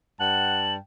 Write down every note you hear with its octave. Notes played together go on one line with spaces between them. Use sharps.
G2 F#5 G5 A5 F#7